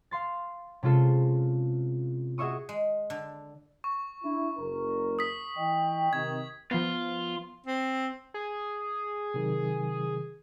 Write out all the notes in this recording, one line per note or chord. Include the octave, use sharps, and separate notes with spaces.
F5 C6 A6
C3 G#3 C#4 F4 A4
F#4 G#4 D#5 E5 C#6 D#6
G#3
D3
C#6
D4 E4
F#1 A#4
D#6 B6
E3 D#5 G5
C3 D#3 G#6
F3 B3 F4
C4
G#4
C3 D#3 F#3